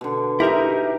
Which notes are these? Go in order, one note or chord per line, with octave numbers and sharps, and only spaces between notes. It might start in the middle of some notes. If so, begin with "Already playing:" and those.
B2 D3
D#4 E4 G4 A#4 E5